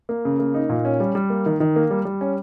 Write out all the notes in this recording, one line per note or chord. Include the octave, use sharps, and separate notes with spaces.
A#3
C#3
A#3
D#4
A#2
C#4
G3
G3
A#3
D#3
D#3
A#3
G3
G3
C#4